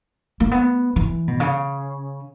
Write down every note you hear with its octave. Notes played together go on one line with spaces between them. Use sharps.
A#3
B3
E3
B2
C#3